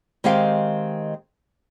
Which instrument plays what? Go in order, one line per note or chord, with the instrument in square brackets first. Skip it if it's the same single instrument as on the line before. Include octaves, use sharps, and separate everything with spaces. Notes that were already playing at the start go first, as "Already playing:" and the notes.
[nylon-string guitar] D#3 G#3 C4 G4 F5